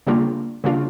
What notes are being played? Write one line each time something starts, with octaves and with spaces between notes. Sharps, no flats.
C#3 G3 A#3 D4 F4
C#3 G3 A#3 D4 F4